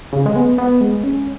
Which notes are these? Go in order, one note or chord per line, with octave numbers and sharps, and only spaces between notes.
C#3
G#3
B3
B3
G#3
C#4